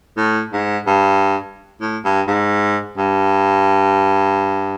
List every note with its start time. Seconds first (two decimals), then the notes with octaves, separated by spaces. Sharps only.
0.17 A2
0.53 G#2
0.87 G2
1.81 A2
2.05 G2
2.28 G#2
2.97 G2